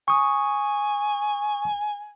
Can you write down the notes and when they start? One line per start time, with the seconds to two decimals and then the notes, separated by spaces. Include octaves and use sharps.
0.08 G#5 C#6 D#6